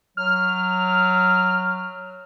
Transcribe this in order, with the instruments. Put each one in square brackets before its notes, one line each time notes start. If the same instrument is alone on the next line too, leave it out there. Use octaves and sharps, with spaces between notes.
[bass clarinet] F#3 [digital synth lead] F6